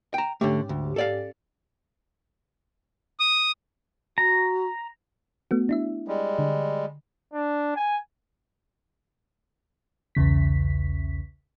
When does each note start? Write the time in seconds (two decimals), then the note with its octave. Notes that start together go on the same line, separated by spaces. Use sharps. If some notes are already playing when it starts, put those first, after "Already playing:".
0.14 G5 A#5
0.41 G#2 D3 A3 C#4 G4
0.69 D2
0.96 A4 D5 F5
3.20 D#6
4.18 F#4 A#5
5.51 A3 B3 F#4
5.69 D4 E4 E5
6.08 G3 G#3
6.39 D3
7.33 D4
7.76 G#5
10.15 B1 E2 C#3 B6